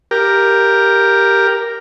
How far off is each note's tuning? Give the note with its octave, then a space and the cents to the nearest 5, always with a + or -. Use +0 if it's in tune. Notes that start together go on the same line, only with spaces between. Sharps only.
G4 +0 A#4 +0